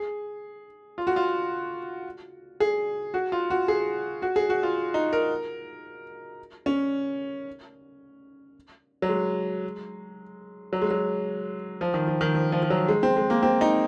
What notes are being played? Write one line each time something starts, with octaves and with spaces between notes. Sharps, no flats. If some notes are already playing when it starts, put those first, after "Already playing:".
Already playing: G#4
F4
F#4
F4
G#4
F#4
F4
F#4
G#4
F#4
G#4
F#4
F4
D#4
A#4
C#4
F#3
G#3
F#3
G#3
F#3
F3
D#3
F3
D#3
F3
F3
F3
F#3
G#3
C4
G#3
A#3
C4
D#4